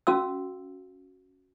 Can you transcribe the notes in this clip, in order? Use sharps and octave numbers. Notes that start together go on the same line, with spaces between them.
C#4 F#4 F5 E6